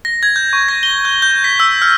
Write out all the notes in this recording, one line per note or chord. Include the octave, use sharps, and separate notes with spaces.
A#6
G#6
G6
C#6
A#6
G7
G6
G6
B6
E6
F6